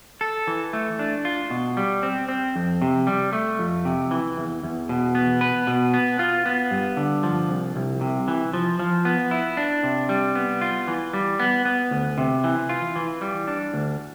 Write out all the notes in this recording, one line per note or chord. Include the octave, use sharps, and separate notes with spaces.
A4
E3
A3
D4
F4
B2
G3
C4
C4
F2
C3
G3
A3
F2
C3
E3
E2
E2
B2
B3
B4
B2
B3
F4
B3
G2
D3
F3
C2
C2
C3
E3
F3
F3
B3
E4
D4
C3
G3
B3
F4
E3
G3
B3
B3
D2
C3
E3
F4
E3
G3
D4
D2